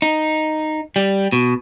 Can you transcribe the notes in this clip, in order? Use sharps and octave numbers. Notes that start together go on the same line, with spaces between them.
D#4
G3
B2